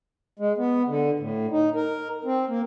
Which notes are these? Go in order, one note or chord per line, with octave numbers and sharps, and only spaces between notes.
G#3
B3
D3
A2
D#4
A#4
C4
A#3